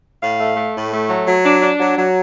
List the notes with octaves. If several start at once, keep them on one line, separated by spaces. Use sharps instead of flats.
A2 F5
A3
A3
A2
A3
F#3
F#3
D4
D4
F#3
F#3